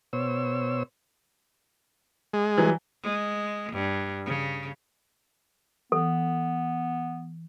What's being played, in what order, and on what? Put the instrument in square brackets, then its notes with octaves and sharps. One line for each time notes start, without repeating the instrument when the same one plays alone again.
[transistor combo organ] B2 C5 C#5 E6
G#3
[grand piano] E3 F#3 G3
[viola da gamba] G#3
G2
C#3
[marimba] E3 [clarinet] B3 [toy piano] A4